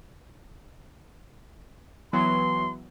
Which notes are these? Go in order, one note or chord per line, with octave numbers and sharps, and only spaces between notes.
E3 F#3 B3 C6